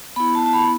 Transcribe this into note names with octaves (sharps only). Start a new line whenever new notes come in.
B3 E4 B5
A5
A5
B5